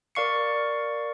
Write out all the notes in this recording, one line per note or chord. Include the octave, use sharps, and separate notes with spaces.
A#4 D5 F5 C#6 C7 C#7